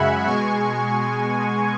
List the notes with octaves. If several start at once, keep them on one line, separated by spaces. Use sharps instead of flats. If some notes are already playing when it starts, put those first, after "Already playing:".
Already playing: F#2 C#3 G#3 E5 F#5 G#5 B5
B2 G#3 G#5 C#6